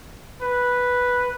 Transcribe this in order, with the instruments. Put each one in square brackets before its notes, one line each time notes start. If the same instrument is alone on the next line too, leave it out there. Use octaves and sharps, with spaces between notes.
[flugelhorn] B4